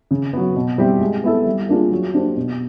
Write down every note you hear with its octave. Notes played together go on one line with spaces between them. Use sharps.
C#3
F#3 B3
B2
G3 C4 E4 G4
G#3
B3 E4 A4
G3
A#3 D4 F4 G#4
F#3
A#3 D4 G4 C5
B2